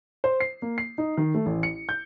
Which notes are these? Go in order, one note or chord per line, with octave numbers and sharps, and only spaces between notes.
C5
C7
A#3
C7
D#4
D#3
A3
A1
C#7
G6